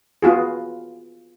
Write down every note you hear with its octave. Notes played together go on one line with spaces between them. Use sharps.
B3 F4 F#4 G#4